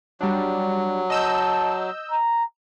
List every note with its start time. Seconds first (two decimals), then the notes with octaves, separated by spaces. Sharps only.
0.21 F#3 G3 D4
1.10 D#5 A5 E6 G6
2.11 A#5